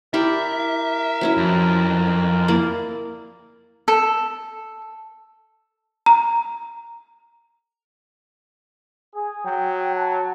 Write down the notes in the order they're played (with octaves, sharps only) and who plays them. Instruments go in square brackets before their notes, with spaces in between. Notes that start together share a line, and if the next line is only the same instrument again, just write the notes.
[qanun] E4 G4 D5 [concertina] A#4 [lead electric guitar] E5
[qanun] F#3 C#4 E4
[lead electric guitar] F2
[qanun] A#3 E4 D5
[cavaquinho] A4
[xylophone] A#5
[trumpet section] G#4
[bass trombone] F#3 [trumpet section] G5
[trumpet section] F#5 A5